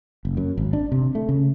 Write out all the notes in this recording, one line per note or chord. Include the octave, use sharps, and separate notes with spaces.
F#1
F#2
G#1
D4
C3
A3
C#3